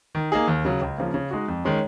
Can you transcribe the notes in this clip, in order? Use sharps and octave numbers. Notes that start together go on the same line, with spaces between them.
D#3
A#3 D#4 G#4
D#2
C#3 F#3
C#2
C#3 F3 A#3
C#3
G#3 D#4 F#4
F2
D#3 G#3 C#4